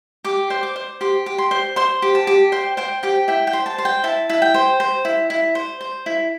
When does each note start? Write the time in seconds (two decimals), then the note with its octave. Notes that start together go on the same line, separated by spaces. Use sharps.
0.24 G4 D6
0.50 C5
0.63 D6
0.76 C5
1.01 G4 C6
1.26 G4
1.38 C6
1.51 C5
1.76 C5 C6
2.02 G4
2.15 A5
2.27 G4
2.52 C5 G5
2.77 C5 G5
3.03 G4 G5
3.28 E4 G5
3.47 G5
3.53 C5
3.66 A5
3.78 C5
3.85 G5
4.04 E4 A5
4.30 E4
4.42 G5
4.54 C5
4.80 C5
5.05 E4
5.30 E4
5.55 C5
5.81 C5
6.06 E4